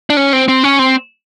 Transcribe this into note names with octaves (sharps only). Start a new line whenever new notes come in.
D4
C#4
C4
C4
C#4
C4